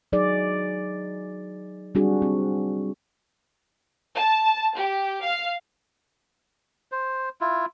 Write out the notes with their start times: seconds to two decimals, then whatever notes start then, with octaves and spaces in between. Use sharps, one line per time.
0.12 F#3 D#4 G#4 D5
1.95 G3 C4 D4 F#4 G#4
2.22 C4
4.16 A5
4.78 G4
5.24 F5
6.92 C5
7.41 E4 F4